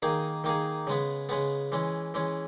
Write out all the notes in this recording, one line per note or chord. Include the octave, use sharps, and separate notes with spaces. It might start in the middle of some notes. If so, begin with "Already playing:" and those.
D#3 A#3 D#4 G#4
D#3 A#3 D#4 G#4
C#3 G#3 B3
C#3 G#3 B3
E3 G#3 C#4
E3 G#3 C#4